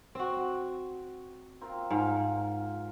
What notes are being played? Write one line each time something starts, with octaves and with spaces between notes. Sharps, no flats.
C4 F#4
C4 F4 A#4
G#2 F4